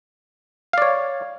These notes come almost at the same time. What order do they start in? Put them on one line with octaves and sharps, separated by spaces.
F5 D5 C#5